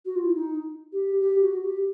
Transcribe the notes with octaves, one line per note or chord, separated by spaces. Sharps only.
F#4
F4
E4
D#4
G4
G4
F#4
G4